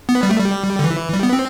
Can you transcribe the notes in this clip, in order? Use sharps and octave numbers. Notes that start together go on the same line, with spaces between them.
B3
G3
A3
G3
D3
E3
G3
B3
C4